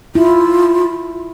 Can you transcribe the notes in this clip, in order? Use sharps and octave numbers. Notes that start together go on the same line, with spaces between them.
E4 F4